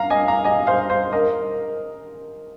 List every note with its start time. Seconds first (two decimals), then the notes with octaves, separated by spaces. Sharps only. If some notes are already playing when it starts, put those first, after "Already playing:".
Already playing: F5 A#5
0.10 D#5 G#5
0.28 F5 A#5
0.44 D#5 G#5
0.67 C5 F5
0.90 C5
1.12 A#4 D#5